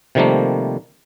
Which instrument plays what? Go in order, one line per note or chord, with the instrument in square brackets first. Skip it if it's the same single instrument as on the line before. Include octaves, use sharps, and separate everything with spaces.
[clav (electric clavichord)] C3 D#3 F3 G3 A3 A#3